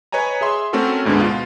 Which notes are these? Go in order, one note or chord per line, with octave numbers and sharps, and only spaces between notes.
B4 C#5 D#5 G#5 A#5
G#4 E5 C6
A3 C4 C#4 F#4 A4 A#4
D2 G#2 D3 G#3 B3
B2 F4